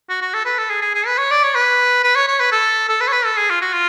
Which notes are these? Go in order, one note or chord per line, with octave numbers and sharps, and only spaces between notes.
F#4
F#4
A4
B4
A4
G#4
G#4
G#4
B4
C#5
D5
C#5
B4
B4
C#5
C#5
B4
A4
A4
B4
C#5
B4
A4
G#4
F4
F#4
F4